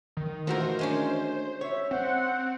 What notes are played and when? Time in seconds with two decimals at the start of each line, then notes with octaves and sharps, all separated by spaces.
0.17 D#3
0.47 D#3 E3 A3 F4 F#4 A#4 C5
0.79 G#3 C#4 D4
1.61 C#5 E5
1.91 C4 C5 F#5